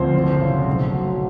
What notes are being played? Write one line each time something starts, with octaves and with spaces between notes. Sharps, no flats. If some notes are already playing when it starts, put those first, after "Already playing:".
Already playing: D2 F3 C4 C5
F#1
C#3
B1
F#3